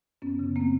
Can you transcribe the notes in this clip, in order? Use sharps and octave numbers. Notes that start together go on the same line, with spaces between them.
F#2 B3 C#4
C#3
A#3 C4